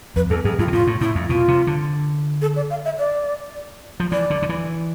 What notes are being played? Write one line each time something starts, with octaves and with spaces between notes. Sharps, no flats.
F2 B4
E2 A4
F2 G#4
F2 F4
B2
A2 F4
A2
A2 E4
F2
B2 F4
C3
D3
A4
D5
F5
E5
D5
F3
E3 D5
D3
D3
E3